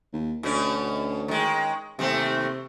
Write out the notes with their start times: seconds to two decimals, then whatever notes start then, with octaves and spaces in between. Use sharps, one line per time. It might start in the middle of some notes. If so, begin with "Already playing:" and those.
0.13 D#2
0.43 D2 B2 C#4
1.28 D#3 G#3
1.99 D#2 C3 A3 C4